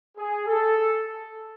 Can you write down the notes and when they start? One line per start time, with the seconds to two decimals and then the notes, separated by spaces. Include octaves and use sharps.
0.17 G#4
0.47 A4